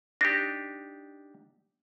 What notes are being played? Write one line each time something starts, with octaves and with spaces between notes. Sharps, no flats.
D4 D#4 G4 A#6